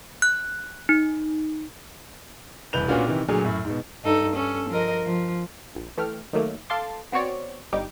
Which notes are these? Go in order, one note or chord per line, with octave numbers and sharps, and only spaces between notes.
F#6
D#4
E1 C2 E3 B4 G6 F7
A#2 B3 C#4 D4 F4 F#4
C3 D#3 E3
A#2 D3 F#3 A3 G#4
F#2 A2
G#2 B2
G2 D#4 A4
C#4 A4
F3 A#4 D#5
F3
A#1
E3 A3 G5 F6
D#3 F#3 A3 A#3
A4 F5 A5 C6 D6
B3 C4 F#4 C#5 D5
G1 G3 D#4 G4 D6